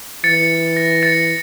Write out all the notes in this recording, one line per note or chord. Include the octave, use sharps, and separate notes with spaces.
E3 A6 C#7
A#6
A6 C#7